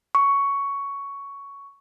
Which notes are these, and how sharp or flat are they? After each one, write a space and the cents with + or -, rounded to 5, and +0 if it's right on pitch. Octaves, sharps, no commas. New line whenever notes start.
C#6 +10